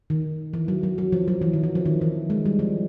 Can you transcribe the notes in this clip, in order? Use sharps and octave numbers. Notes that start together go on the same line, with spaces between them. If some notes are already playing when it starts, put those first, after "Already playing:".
D#3
E3
F#3
F#3
F#3
F3
F#3
E3
D#3
E3
F3
D#3
E3
G#3
G3
F3